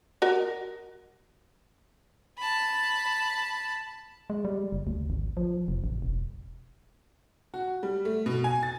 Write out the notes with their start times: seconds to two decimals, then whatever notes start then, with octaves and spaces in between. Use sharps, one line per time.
0.22 F#4 A#4 D#5
2.38 A5 B5
4.30 G#3
4.45 G3
4.72 F#1
4.87 D2
5.10 G#1
5.37 F3
5.68 F1
5.84 A1
6.02 E1
7.54 F#4
7.83 G3
8.05 A3
8.26 B2
8.44 G#5
8.63 A6